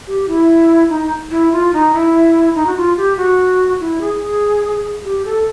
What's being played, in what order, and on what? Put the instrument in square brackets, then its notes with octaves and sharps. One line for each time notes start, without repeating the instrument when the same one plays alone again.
[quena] G4
E4
D#4
E4
F4
D#4
E4
D#4
F#4
F4
G4
F#4
E4
G#4
G4
A4